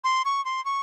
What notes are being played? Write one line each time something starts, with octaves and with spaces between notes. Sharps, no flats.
C6
C#6
C6
C#6